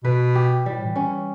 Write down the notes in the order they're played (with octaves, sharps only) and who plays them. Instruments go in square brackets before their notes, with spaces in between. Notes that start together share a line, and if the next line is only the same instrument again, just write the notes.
[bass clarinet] B2 [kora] B4
[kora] G4
[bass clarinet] A2 [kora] G3
[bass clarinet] E3
[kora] C#4
[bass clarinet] E3